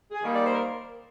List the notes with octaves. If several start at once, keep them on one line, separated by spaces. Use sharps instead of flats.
G#4
D#3 G3 A#3
D5
C5
A#4